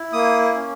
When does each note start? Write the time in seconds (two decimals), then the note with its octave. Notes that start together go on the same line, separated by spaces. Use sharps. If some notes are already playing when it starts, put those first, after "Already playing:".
Already playing: E4
0.13 A#3 D#6
0.55 C#4